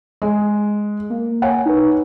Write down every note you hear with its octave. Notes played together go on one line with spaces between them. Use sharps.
G#3
A#3
C#5 F#5 G#5
D#4 B4